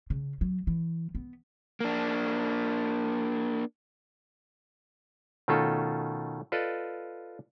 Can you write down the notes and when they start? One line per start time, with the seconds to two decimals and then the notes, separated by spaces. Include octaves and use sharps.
0.10 C#3
0.41 F#3
0.67 E3
1.15 B3
1.80 A#3 D4
5.48 B2 D#3 A3 C#4 F4 A4
6.52 F4 A4 B4 D5 D#5